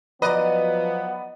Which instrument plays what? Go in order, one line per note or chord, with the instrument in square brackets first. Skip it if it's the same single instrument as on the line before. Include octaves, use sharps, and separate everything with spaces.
[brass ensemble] F3 F#3 B3 [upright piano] B4 D5 A#5 [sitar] D#5